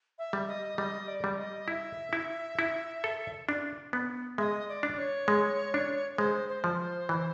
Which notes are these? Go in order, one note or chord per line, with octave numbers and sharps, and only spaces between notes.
E5
G3
D#5
G3 D#5
D5
G3
D#5
E4 E5
E4
E4
A4
D4
B3
G#3 D#5 E5
D5
D4
C#5
G#3
D4
G#3 C5
C5
F3
C5
E3